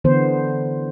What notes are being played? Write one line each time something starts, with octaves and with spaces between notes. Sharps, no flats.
D3 E3 B3 C5